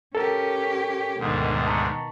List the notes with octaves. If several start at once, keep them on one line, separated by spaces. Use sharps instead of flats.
C#4 G4 A4 A#4
D2 G#2 B2 D#3
A5 A#5 C#6